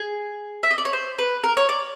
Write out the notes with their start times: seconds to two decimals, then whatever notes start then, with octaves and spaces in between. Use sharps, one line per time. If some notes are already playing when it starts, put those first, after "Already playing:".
Already playing: G#4
0.63 E5
0.71 D#5
0.78 D5
0.85 C#5
0.93 C5
1.18 B4
1.44 A#4
1.57 C#5
1.69 D5